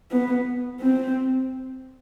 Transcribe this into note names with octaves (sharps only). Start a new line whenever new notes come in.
B3
C4